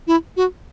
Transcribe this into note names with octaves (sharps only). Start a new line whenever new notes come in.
E4
F#4